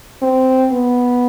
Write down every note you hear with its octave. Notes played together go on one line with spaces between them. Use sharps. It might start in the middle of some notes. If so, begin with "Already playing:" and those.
C4
B3